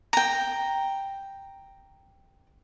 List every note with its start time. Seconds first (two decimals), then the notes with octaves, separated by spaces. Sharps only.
0.13 G5 A#5